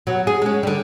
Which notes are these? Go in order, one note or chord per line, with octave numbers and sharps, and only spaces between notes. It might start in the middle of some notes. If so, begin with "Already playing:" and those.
B2 F#3
G#4
G#3 C#4
D3 G3